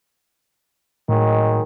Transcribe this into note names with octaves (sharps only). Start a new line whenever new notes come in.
A2 D#3 F#3 G#3